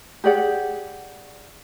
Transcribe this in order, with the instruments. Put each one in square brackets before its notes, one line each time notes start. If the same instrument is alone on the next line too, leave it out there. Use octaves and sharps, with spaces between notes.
[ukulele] G4 G#4 D5 F#5